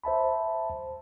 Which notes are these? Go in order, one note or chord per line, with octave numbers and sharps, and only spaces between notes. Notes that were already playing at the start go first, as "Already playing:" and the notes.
C5 E5 A5 B5